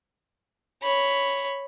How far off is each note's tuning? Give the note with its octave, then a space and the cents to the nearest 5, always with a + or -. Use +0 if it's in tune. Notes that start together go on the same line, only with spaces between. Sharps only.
C#5 +0 B5 +0